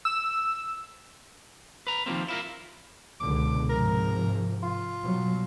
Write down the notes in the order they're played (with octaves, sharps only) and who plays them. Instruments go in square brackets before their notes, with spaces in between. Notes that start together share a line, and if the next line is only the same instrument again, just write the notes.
[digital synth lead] E6
[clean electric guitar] B4 A#5
D#3 F3 G3 G#3 A#3 C4
E4 F4 A#4
[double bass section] C#2 B2 D3 [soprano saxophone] D6
[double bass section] G#2 C3 F3 [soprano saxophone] A#4
[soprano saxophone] F4
[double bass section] B2 F#3 G3